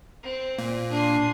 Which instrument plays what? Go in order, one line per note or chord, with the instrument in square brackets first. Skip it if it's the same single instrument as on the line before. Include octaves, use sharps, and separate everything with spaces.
[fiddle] C4
[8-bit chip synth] A#2
[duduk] D4 [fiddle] G#4 C6